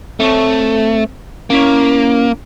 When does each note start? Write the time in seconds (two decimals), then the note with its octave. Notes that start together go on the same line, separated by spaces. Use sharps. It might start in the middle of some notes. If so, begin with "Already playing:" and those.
0.20 A3 C4 A4 C#5
1.50 A#3 C#4 E4 C#5